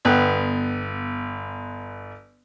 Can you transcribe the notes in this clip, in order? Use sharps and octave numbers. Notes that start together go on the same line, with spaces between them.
G1 B3 G5 F#6